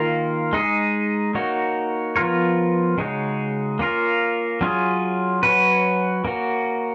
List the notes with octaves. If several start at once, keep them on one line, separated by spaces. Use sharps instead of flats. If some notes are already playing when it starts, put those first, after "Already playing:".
Already playing: D#3 A#3 F4 A#4
G#3 D#4 G#4
A#3 D#4 F#4 C#5
F3 B3 F4 A#4 C#5
C#3 G#3 D#4 F#4 C#5
A#3 C#4 F4 A#4
F#3 C#4 F4 G#4
F#3 C#4 F#4 B4
A#3 C#4 F#4